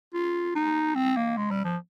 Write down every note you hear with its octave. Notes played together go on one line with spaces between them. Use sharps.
F4
D#4
C4
A#3
G#3
G3
F3